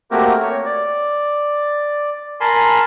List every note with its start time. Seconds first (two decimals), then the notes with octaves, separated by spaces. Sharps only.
0.11 A3 A#3 C4 F#4 G4 A#4
0.42 C#5
0.65 D5
2.40 A#4 G#5 A5 B5 C6